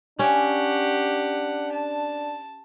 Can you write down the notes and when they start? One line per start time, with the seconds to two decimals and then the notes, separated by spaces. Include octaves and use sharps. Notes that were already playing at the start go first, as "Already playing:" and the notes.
0.19 C#4 D4 G4 F#5
1.72 A5